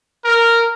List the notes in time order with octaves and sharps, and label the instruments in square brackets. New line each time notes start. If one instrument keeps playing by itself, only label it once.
[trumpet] A#4